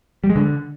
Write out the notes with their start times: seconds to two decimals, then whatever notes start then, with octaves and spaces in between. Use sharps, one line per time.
0.24 G3
0.30 G#3
0.36 D3